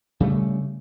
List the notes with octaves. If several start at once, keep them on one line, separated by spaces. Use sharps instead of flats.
C#3 G3 A3